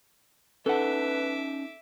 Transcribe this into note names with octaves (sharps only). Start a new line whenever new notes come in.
C#4 D#4 A4 B4 E5 F#5 A5 D6